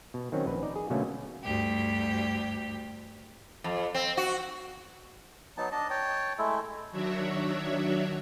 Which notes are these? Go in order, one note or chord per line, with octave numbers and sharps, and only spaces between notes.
B2
D#3 F#3 C4 C#4
A#1 B4
D#4 D5
G#4
B2 D3 F#3 A3 A#3 C#4
D2 G2 G4
F2
C4
F#4
F#3 B3 D#4 A5
D4 D#5 A5
C#5 G5 A5
G#3 A3 E4 A4
D#3 F#3 D4 F#4 C#5 E5